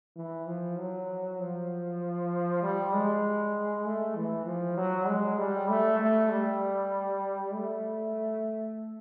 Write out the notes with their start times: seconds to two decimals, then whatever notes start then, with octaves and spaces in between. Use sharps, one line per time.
0.16 E3
0.47 F3
0.78 F#3
1.39 F3
2.63 G3
2.93 G#3
3.85 A3
4.15 E3
4.46 F3
4.77 F#3
5.07 G#3
5.38 G3
5.68 A3
6.00 A3
6.30 G3
7.54 A3